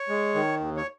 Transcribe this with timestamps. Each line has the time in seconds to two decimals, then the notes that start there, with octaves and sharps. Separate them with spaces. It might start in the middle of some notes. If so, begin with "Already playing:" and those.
Already playing: C#5
0.09 G#3
0.35 D#3
0.60 D#2
0.76 C#5